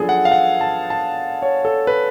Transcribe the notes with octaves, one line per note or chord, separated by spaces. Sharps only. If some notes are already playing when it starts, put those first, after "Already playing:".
Already playing: F#2 F3 B3 D4 G#4 A4
F#5
F5
F#5
A5
A5
C#5
A4
B4